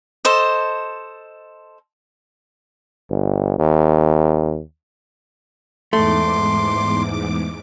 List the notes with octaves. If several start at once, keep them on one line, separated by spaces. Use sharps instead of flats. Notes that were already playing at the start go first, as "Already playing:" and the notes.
A4 C5 D#5
G1
D#2
E2 G#2 A3 C6 D6